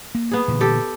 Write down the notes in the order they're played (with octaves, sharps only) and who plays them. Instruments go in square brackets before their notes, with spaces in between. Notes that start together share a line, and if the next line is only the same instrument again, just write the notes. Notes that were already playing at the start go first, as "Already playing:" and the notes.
[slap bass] A#3
[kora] B3 G#4
[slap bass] A#2 D3 E3
[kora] G4 A4